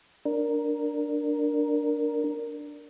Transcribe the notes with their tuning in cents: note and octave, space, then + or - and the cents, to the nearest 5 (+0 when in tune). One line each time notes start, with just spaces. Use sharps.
D4 +0 A#4 +0